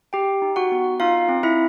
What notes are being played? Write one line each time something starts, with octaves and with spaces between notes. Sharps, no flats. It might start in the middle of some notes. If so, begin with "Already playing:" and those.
G4 G5
D#4
F#4 F#5
B3
D#4 F4 F5
C4
E4 E5